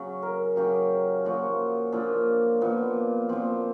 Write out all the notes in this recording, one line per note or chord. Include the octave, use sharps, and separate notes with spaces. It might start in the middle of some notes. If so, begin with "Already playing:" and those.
Already playing: C#3 F#3
A#4
C#3 F#3 G4
A#2 F3 F#4
A#2 F3 D4
A#2 F3 B3
A#2 F3 C4